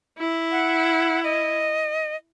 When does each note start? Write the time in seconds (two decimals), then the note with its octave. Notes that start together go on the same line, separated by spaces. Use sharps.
0.18 E4
0.51 F#5
1.24 D#5